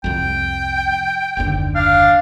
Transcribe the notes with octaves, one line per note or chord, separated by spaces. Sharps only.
C2 F2 G5
F#1 D#2 D3
D4 F5